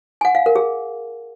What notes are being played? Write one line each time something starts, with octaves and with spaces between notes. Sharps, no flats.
G#5
F#5
F5
A#4
G#4